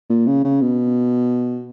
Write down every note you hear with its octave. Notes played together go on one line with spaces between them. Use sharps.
A#2
C#3
C#3
B2